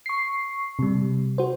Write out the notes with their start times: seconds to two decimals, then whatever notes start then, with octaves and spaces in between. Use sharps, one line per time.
0.06 C#6 C7
0.79 C3 G3
1.38 F#4 C5